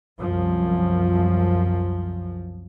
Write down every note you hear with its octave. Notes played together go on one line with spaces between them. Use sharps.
C2 F#2 F3